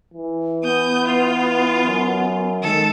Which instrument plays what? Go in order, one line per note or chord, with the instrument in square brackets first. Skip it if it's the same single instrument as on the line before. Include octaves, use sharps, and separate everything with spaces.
[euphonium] E3
[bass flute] B3 [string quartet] D#6 G6
[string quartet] F4
[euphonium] F#2
[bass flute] D#3 [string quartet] G#3 A4